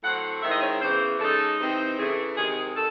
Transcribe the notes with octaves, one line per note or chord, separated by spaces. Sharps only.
A2 F#3 C4 F#5
G#2 D#3 G#3 C4 E4 E5
D#5
C#5
E2 C#3 E3 C5
C#3 G#3 D#4 A4
C3 E3 C4 D#4
C#3 E3 A3 G#4
C3 D#3 G#3 G#4
D#3 A4